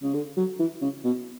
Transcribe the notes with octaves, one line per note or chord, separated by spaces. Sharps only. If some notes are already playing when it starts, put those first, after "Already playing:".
C#3
D3
F#3
E3
C#3
B2